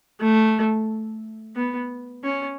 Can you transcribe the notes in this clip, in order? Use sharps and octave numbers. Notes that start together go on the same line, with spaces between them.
A3
B3
C#4